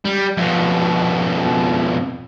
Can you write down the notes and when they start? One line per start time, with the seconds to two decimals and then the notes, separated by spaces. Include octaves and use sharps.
0.05 G3
0.37 F2 B2